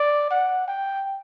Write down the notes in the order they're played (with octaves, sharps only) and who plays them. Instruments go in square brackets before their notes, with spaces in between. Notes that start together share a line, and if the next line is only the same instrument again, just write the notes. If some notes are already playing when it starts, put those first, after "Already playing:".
Already playing: [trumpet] D5
F#5
G5